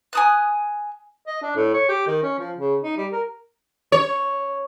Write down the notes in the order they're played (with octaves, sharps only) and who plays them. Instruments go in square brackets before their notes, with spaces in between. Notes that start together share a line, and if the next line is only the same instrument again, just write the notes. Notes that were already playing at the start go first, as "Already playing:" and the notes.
[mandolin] G#5 D#6 F#6
[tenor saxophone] D#5
D4
A2
C#5
G4
D#3
C#4
F3
C#3
D#4
G3
A#4
[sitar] C#5